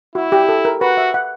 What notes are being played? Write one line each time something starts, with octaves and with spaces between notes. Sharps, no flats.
E4 F#4
G4
A4
A#4
F#4 B4
E5
F#5